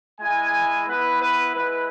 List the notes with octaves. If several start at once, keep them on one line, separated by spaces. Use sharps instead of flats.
G#3 E4 G#5
B3 E4 B4
B4
G#3 E4 B4